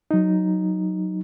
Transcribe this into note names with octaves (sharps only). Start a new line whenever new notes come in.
F#3 D#4